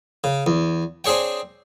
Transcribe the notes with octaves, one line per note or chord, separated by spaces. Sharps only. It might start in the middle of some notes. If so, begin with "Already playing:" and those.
C#3
E2
C4 D4 G#4 C#5 G5